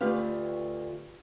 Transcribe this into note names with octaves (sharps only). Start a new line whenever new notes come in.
D2 F4 G4 B4 F5